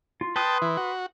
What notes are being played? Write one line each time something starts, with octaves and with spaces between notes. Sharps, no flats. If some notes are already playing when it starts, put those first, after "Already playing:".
F4
B4 G5 A5 C6 D#6
E3
F#4